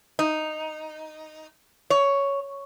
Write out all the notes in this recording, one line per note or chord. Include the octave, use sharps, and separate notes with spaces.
D#4
C#5